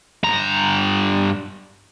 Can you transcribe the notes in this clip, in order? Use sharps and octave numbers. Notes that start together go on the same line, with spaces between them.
G2 A#5